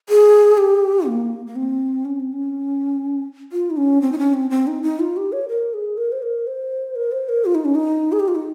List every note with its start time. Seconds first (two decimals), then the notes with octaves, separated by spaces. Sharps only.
0.09 G#4
0.57 G4
1.07 A#3
1.47 A#3
1.56 C4
2.05 C#4
2.20 C4
2.33 C#4
3.52 F4
3.70 D#4
3.77 C#4
4.02 C4
4.12 D#4
4.18 C#4
4.34 C4
4.50 C4
4.67 D#4
4.83 D#4
5.00 F4
5.17 G4
5.32 C#5
5.49 A#4
5.74 G#4
5.98 A#4
6.12 C5
6.22 A#4
6.47 C5
6.96 A#4
7.12 C5
7.29 A#4
7.45 F4
7.55 D#4
7.65 C#4
7.75 D#4
8.12 G#4
8.20 G4
8.28 F4
8.35 D#4